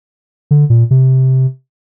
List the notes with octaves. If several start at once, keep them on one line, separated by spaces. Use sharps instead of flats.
D3
A#2
C3